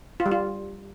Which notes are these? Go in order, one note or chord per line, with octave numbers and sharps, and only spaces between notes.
F4
G3
F4